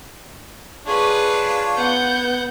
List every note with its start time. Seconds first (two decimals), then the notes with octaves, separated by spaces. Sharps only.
0.86 D4 F4 G#4 B4 C#5
1.77 B3 F#5 G6